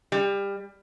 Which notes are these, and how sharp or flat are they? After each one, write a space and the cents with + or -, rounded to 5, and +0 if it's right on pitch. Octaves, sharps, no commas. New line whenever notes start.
G3 +25